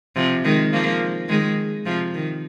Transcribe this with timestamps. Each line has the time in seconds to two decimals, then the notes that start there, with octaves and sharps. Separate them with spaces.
0.16 C3 F3
0.44 D#3 G#3
0.73 F3 A#3
1.29 D#3 G#3
1.86 C3 F3
2.14 D#3